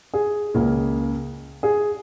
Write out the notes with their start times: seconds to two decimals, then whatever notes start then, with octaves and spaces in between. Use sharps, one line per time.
0.13 G#4
0.54 C#2 C#3 A#3
1.63 G#4